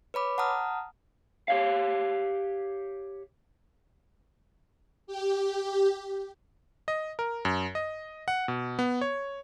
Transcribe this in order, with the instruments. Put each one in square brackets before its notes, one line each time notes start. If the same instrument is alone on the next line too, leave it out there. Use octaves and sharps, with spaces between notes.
[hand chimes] B4 C#5 B5 D6
F#5 A5 A#5 D#6 F6
[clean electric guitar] G4 C#5 F5
[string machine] G4
[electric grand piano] D#5
A#4
F#2
D#5
F#5
B2
B3
C#5